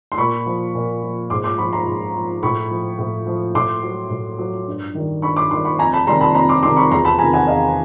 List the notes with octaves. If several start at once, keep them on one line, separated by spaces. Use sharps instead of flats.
C6
A#2 B5 C#6
F3
A#2
F3
G#2 C6 D6
C6 D6
F3 B5 C#6
A#5 C6
G#2
F3
A2 B5 C#6
F3
A2
F3
A2 C6 D6
F#3
A2
F#3
G2
D#3 G3
G2 B5 C#6
C6 D6
D#3 G3 C6 D6
B5 C#6
F2 G#5 A#5
A5 B5
C3 D#3 G3 A#5 C6
A5 B5
F2 A#5 C6
C6 D6
C3 D#3 G3 C6 D6
B5 C#6
E2 A#5 C6
A5 B5
C3 D#3 G#5 A#5
F#5 G#5
E2 D#5 F5